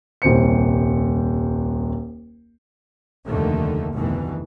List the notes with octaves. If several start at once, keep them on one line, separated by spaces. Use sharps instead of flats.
D#1 C2 C5 C#7
F1 D#2 D3 D#3 A3 A#3
F1 D2 B2 D#3 E3